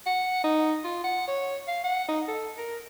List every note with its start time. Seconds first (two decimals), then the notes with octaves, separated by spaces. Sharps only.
0.06 F#5
0.44 D#4
0.84 F4
1.04 F#5
1.28 C#5
1.68 F5
1.84 F#5
2.08 D#4
2.28 A4
2.58 A#4